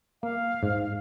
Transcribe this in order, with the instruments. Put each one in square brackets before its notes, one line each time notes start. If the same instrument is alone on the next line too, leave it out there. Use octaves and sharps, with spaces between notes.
[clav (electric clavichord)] A#3 [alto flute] F5
[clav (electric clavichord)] G#2